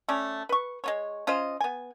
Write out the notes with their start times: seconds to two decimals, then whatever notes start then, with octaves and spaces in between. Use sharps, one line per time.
0.09 A3 C#4 D5
0.49 B4 C#6
0.84 G#3 B3 C#5
1.27 C#4 F4 C5 D#5
1.60 B3 G#5